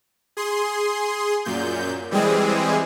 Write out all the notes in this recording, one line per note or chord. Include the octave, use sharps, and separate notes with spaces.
G#4 C6
F#2 A#2 G6
E3 G3 G#3 C4 G#4